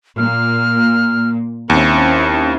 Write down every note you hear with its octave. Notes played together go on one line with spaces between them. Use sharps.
A#2 A#3 F6
D#2 C4 C#4 E4 C#7